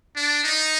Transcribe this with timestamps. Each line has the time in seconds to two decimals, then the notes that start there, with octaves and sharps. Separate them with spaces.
0.16 D4
0.44 D#4